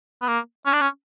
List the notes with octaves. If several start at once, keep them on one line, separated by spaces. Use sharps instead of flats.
B3
A#3
C#4
D4
C#4